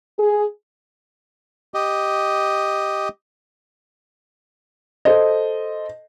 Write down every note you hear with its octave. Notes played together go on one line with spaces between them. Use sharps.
G#4
G4 D#5
A4 C5 D#5